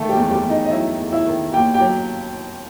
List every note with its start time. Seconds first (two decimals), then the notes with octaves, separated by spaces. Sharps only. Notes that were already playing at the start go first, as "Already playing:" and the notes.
Already playing: D#3 A3 A4
0.09 G3 G4
0.17 E2
0.30 G3 G4
0.43 E2
0.50 D#4 D#5
0.65 D#5
0.71 F#3 E4 E5
0.98 E2
1.12 E4 E5
1.26 D#3
1.53 D#2 G4 G5
1.74 G4 G5
1.80 F#3